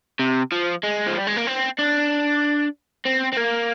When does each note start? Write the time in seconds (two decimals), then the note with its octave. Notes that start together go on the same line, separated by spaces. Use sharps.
0.19 C3
0.52 F3
0.84 G#3
1.07 F3
1.17 G3
1.27 G#3
1.37 A#3
1.47 C4
1.79 D4
3.06 C4
3.33 C4
3.37 A#3